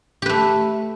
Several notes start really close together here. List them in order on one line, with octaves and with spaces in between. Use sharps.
G4 B4 A3